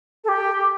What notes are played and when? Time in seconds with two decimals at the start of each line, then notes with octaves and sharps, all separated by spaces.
0.24 A4
0.28 G4